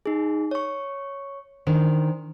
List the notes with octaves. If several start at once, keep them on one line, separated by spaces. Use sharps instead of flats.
D#4 G#4
C#5 C#6
D#3 D4 C5